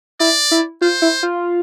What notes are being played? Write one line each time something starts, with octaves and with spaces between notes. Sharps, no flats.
E4 D5
E4
F4 C5
E4
F4